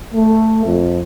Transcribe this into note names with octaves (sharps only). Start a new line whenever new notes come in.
A3
F2